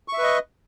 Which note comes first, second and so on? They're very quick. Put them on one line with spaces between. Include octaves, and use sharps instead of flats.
C#6 E5 B4 D#5